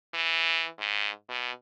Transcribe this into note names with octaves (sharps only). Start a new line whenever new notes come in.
E3
G#2
B2